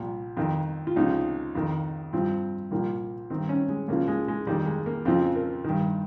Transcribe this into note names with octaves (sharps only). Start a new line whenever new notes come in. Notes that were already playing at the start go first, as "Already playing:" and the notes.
Already playing: C2 A#2 F3
F2 D#3
F4
C#2 C3 F3 D#4
F2 D#3
G2 F3 C4
C2 A#2 F3 A#3
G2 D#3 C4
C#4
G#3
C#2 C#3 F3 A#3
G#3
G#3
F2 D#3 G3
G#3
A#3
F2 C#3 F3 C4
A#4
G2 D#3